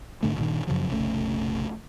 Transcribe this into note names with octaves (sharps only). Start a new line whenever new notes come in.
G#2 D3 A3
G2 A#2 D3 D#3
F#2 C#3 F3 F#3
F1 A#1 C#3 A3